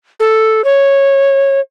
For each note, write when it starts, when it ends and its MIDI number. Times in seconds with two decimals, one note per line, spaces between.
0.20 0.64 69
0.64 1.60 73